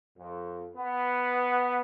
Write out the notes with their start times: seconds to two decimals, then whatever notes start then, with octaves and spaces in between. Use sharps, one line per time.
0.17 F2
0.76 B3